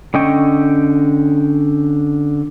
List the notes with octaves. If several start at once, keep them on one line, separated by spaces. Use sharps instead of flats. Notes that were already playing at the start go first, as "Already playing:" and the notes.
D3 C#4 D#5 G5 C#6